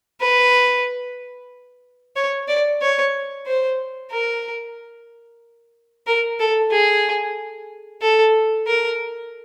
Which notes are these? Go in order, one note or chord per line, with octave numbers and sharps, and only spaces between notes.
B4
C#5
D5
C#5
C5
A#4
A#4
A4
G#4
A4
A#4